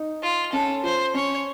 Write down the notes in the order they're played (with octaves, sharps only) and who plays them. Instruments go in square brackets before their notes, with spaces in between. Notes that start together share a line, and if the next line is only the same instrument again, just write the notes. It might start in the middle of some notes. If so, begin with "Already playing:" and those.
Already playing: [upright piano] D#4
[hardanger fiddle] F4
[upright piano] C#4 [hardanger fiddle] A4
[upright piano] F4 [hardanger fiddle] C5
[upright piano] C#4 [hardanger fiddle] C#5